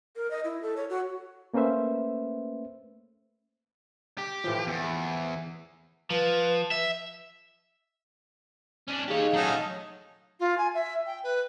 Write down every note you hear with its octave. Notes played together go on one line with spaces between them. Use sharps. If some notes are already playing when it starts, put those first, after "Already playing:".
A#4
D#5
E4
A4
C#5
F#4
A3 A#3 C#4 B4 C5 E5
G4
A2 E3 F3
E2
F3 B4
E5
C#4 D4
D#4 G4 G#4 C#5 F5
F#3 A3 C#4 D#4 A5
F4
G#5
E5
G5
B4